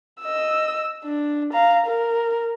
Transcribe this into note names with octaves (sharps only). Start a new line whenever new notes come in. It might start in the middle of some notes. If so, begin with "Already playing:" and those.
D#5 E6
D4
F5 A#5
A#4